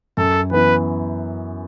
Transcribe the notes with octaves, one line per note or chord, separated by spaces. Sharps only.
F#2 A4
E3 B3 E4 B4